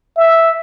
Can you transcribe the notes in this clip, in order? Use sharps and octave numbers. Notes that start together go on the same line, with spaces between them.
E5